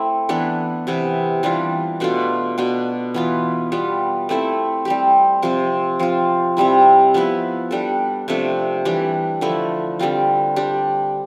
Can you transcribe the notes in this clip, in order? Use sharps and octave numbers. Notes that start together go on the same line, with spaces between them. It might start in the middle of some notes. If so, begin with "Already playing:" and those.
Already playing: A3 C4 E4
E3 B3 D4 A4
C3 E3 B3
E3 G3 D4 F4
B2 A3 D4 F4
B2 B3 D4
E3 B3 F4
G3 B3 F4
A3 C4 E4 A4
G3 C4 G4
C3 F3 C4
F3 C4 F4
C3 G3 C4 E4
F3 B3 E4 B4
G3 D4 A4
C3 F3 A3 D4
E3 G3 D4 G4
D3 F3 A3 E4
D3 G3 C4 F4
G3 D4 G4